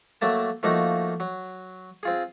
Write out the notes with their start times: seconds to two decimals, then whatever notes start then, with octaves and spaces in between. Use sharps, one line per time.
0.21 F#3 A3 A#3 A5
0.63 F3 A3 A#3 D#4 F#4
1.20 F#3
2.03 C4 F4 G#4